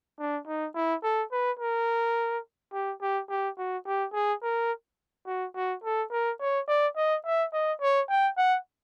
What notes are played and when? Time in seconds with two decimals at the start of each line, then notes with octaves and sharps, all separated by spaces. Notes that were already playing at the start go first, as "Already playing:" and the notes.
0.19 D4
0.47 D#4
0.75 E4
1.03 A4
1.32 B4
1.60 A#4
2.73 G4
3.02 G4
3.30 G4
3.58 F#4
3.86 G4
4.13 G#4
4.42 A#4
5.26 F#4
5.55 F#4
5.84 A4
6.12 A#4
6.40 C#5
6.68 D5
6.96 D#5
7.25 E5
7.53 D#5
7.81 C#5
8.09 G5
8.37 F#5